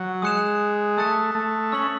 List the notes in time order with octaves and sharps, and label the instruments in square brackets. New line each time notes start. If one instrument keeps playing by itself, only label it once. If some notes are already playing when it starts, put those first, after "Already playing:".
Already playing: [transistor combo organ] F#3
[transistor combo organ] G#3 [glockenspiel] D#6 F#6 C#7 E7
[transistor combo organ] A3 [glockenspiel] D#6 F#6 A6 C#7
[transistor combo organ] A3
[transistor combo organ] C#4 [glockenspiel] E6 B6 F#7